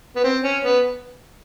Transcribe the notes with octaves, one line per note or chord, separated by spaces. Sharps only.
B3
C4
C#4
B3